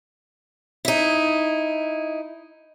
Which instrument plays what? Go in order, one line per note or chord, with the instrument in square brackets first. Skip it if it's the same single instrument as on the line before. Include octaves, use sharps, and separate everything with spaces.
[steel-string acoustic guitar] D#4 E4